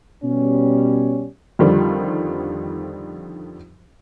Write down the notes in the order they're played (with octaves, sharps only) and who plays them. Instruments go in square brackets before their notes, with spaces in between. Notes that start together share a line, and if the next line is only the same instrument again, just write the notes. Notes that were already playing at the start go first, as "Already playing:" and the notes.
[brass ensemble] B2 G3 C#4
[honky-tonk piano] F2 D3 D#3 F3 G3